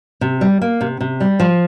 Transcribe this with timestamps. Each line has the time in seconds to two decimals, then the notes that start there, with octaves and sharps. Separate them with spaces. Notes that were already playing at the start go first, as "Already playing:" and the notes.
0.21 C3
0.41 G3
0.62 A#3
0.81 C3
1.01 C3
1.20 G3
1.40 F3